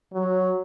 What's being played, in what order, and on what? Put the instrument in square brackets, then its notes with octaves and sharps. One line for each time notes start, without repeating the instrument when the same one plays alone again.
[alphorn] F#3